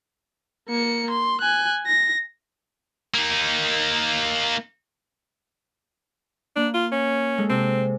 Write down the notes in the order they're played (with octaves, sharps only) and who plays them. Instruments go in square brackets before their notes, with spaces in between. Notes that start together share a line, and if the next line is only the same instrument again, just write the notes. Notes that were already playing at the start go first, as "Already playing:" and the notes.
[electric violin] A#3 C#7
C6
G#5 F#6
A#6
[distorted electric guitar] A#3 D#4
[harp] A#3 [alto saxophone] D4
[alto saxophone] F4
C#4
[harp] G#3 A4
[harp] C3 [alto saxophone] C4